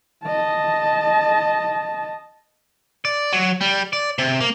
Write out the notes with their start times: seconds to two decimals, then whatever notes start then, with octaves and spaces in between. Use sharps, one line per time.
0.24 D#5 A5
3.05 D5
3.33 F#3
3.61 G3
3.93 D5
4.18 C3
4.40 A#3